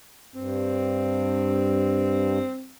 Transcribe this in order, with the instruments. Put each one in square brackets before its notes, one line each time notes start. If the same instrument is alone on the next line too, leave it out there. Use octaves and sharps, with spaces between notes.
[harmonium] G2 [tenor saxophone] C4